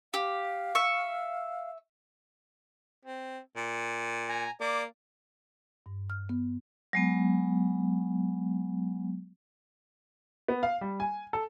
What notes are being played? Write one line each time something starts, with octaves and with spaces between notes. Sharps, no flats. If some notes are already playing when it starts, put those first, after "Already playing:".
G4 F5
E5 C#6
C4
A#2
G#5 A#5
A#3 D5 D6
G2
F6
B3
F#3 G#3 B3
B3
F5
G3
G#5
A4